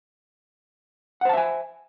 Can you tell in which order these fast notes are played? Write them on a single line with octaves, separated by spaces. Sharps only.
F#5 C5 A5 E5 G#5